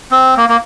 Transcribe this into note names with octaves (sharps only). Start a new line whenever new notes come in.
C4
A#3
A#3